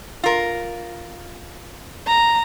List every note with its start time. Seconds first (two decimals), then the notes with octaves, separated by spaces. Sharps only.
0.24 F4 A#4
2.07 A#5